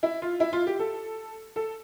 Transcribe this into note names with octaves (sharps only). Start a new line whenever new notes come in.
E4
F4
E4
F4
G4
A4
A4